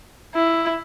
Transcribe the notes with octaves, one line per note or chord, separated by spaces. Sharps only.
E4